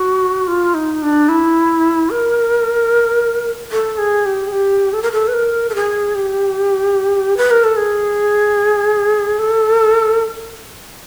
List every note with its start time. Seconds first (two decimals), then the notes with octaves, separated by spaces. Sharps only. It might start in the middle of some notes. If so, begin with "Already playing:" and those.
Already playing: F#4
0.48 F4
0.74 D#4
1.02 D4
1.29 E4
2.10 A#4
3.72 A4
3.98 G#4
4.26 G4
4.48 G#4
4.52 G4
4.93 A4
5.02 A#4
5.12 A4
5.28 B4
5.34 A#4
5.70 A4
5.75 G#4
6.15 G4
7.37 B4
7.51 A#4
7.64 A4
7.77 G#4
9.39 A4